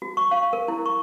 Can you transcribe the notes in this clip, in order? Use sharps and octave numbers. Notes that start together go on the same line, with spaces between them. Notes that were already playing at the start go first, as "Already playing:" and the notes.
F#4
C#6
F5
A#4
E4
C#6